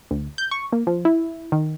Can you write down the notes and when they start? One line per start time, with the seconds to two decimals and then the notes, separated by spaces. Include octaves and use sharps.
0.11 D2
0.38 G6
0.51 C#6
0.73 A#3
0.87 F3
1.05 E4
1.52 D#3